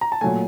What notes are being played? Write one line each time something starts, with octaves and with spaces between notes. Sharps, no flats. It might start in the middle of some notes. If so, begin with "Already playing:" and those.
A#5
A5
A#2 F#3 A3 G#5